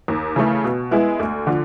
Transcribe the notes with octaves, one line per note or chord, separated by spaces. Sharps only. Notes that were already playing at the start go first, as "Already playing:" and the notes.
D#2
C#3 E3 A3
B2
G#3 B3 E4
D2
D3 F3